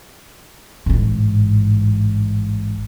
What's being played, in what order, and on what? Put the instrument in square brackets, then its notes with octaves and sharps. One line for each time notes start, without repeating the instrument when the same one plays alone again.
[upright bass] A1 G#2